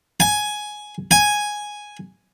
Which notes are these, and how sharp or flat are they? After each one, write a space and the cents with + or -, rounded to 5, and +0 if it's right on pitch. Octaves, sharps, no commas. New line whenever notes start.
G#5 +10
G#5 +0